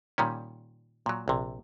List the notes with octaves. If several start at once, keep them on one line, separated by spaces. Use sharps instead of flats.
A#2 D#3 G3 C#4
A#2 F#3
A#1 C3